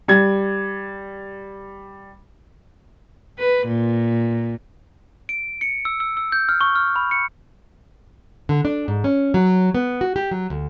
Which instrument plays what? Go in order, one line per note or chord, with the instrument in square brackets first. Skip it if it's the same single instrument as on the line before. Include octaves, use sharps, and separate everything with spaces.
[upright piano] G3 G#6
[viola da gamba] B4
A#2
[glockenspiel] D7
C#7
E6
E6
E6
G6
F6
C#6
F6
B5
C#7
[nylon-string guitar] D3
D4
G#2
C#4
F#3
B3
F#4
G4
F#3
D2